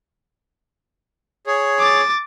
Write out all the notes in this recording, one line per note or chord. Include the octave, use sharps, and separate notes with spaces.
G#4 C#5
D6 A6